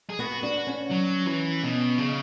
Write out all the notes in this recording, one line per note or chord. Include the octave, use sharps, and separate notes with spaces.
G#4
B3 F#4
D4 F#4
C#4
F#3
E3
B2
C#3